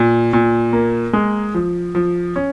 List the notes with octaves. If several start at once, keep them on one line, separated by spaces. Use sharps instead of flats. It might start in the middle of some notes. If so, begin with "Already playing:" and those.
Already playing: A#2
A#2
A#3
G#3
F3
F3
C#4